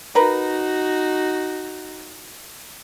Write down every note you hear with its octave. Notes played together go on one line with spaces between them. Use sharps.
D#4 F#4 A#4 B4